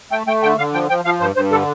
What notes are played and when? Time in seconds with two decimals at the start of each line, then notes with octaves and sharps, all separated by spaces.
0.11 A3 G5
0.27 A3 G5
0.43 D3 G5
0.58 D3 F5
0.73 F3 G5
0.89 F3 G5
1.05 F3 F5
1.21 G2 C5
1.36 G2 C5
1.51 D3 A4